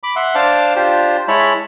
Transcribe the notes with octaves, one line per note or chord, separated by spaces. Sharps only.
B5 D6
E5 F#5 C6
D4 C5 F5 A5 D6
D4 F4 G4 C5
G#3 E4 C#5 A5 B5